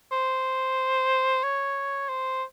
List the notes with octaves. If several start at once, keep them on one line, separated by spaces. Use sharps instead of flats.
C5
C#5
C5